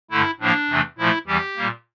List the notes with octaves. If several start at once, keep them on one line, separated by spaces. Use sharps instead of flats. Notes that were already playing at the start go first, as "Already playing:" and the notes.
G2 D3 A3 E4
A2 F3 A#3 D4
E2 C3 E3 A3
A#2 F3 A3 E4
E2 E3 G3 G4
A#2 G3 A#3